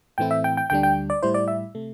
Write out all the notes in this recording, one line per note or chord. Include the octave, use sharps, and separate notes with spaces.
A2 E3 A3 C4 E4 G5
E5
G5
G5
D2 D3 G3 D4 G5
G5
D5
A2 G3 E4 C5
D5
E5
C3 A3